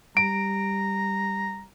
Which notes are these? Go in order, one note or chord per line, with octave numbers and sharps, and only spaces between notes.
G3 A#5 D7